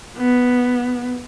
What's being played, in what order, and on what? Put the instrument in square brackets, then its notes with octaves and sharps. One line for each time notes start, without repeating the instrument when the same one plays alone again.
[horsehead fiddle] B3